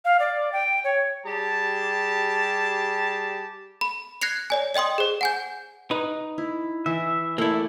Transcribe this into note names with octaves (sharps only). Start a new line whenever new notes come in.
F5
D5
G5
C#5
G3 G4 G#4 A5
B5
F#6 G#6 A#6 C7 C#7 F7
C#5 D5 G#5
D5 D#5 G5 C6 D#6
G#4 C5
F#5 G#5 G6
D#4 B4
E4
E3 E5
A3 A#3 E4 D5